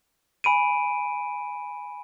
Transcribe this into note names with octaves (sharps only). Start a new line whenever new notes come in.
G#5 B5 D7 D#7